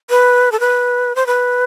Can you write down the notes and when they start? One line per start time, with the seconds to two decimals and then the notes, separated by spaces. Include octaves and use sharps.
0.10 B4
0.52 A4
0.60 B4
1.15 C5
1.27 B4